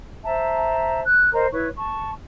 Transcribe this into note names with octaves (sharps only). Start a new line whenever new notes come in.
C5 E5 A5 A#5
F#6
A#4 C5 D#5 A#5
E4 B4 C#5 C#6
A5 C#6